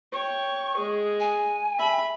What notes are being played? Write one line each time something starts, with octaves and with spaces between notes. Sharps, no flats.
C#5 G5 C#6
G#3 G#4
G#5
E5 B5